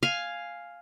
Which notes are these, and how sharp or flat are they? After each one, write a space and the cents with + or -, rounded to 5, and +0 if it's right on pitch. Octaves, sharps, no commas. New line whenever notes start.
F5 +0 G#5 +0